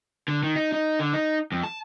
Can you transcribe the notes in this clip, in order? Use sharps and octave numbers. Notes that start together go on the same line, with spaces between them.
D3
D#3
D#4
D#4
D3
D#4
F2
A5